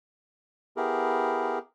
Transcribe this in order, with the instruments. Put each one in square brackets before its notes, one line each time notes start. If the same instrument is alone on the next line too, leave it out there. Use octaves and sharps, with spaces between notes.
[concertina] B3 E4 G4 G#4 A#4